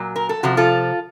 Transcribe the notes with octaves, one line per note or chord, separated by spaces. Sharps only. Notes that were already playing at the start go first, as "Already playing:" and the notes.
Already playing: A#2 F#3
A#4
A4
C3 F3 F#4
F4 A4